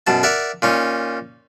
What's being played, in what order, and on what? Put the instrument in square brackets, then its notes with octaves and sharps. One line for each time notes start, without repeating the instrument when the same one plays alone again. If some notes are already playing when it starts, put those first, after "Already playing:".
[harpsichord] F#2 B2 A5
A#4 D5 E5 F#5
A#2 C#4 D#4